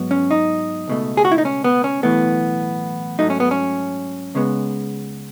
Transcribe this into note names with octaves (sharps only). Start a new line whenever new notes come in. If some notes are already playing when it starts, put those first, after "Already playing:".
Already playing: G#2 F#3 B3
C#4
D#4
C#2 B2 A3
G#4
F#4
E4
D#4
C#4
B3
C#4
B1 A2 E3 A3 B3
G#2 F#3 A3 D#4
C#4
B3
C#4
C#2 C#3 G#3 B3